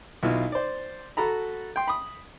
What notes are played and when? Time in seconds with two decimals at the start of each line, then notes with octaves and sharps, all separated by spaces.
0.23 B1 B2 E4 F4 F5
0.52 C5 D5
1.17 F#4 A4 A#5 B5
1.76 G5 C6
1.88 B5 D#6